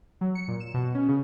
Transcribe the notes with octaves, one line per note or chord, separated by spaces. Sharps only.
F#3
C#7
A#2
E7
B2
C#4
C#3